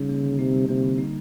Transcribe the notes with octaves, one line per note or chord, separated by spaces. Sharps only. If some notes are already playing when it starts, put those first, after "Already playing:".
Already playing: C#3 G3 D#4
A#3
D3
C3 D#4
G3
C3 A#3
D3
D#4